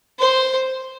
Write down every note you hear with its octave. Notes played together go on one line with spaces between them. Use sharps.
C5